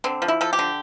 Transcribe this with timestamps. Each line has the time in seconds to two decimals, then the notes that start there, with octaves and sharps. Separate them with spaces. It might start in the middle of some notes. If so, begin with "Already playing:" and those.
0.04 D3 C4
0.22 F3
0.28 E4
0.41 F3 A4
0.53 G4
0.59 D3